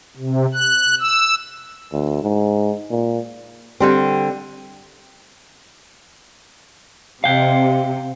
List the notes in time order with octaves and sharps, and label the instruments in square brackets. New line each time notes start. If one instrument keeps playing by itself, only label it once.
[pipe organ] C3
F#6
E6
[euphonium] D2
G#2
A#2
[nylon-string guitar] D3 G3 C4
[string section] C3 [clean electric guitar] F5 G5